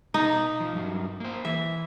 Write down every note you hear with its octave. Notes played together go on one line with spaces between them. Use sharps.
B2 D#4 A#5
F3
G2 F#3
A#3 C5
E3 E5